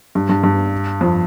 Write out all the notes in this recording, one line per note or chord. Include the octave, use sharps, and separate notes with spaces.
G2
G2
G2
F2